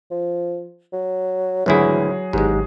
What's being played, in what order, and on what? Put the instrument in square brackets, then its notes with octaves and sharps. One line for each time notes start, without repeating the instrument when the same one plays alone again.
[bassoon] F3
F#3
[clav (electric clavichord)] G#1 D2 E4 [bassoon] E3 [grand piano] F#3 G#4
[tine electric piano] G#1 G4 [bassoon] E2 [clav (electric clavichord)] G#2 G#3